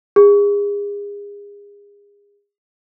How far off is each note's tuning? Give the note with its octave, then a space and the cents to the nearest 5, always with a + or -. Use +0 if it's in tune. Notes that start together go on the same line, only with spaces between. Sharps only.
G#4 -35